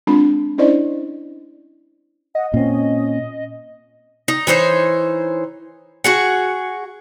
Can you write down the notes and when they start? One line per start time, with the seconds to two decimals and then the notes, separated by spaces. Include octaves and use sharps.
0.07 G#3 C4 D4 F4 B5
0.58 C#4 D4 E4 C5 D5 D#5
2.35 D#5 F#5
2.54 A#2 C4 C#4
4.28 D#4
4.47 E3 D#4 C5 C#5
6.04 F#4 G#4 F#5